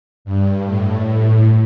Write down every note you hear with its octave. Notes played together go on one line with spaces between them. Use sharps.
G2
A2